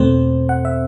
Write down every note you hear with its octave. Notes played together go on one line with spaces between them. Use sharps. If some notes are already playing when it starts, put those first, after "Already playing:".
Already playing: E2 B2 A3 C4 C5
F#5
E5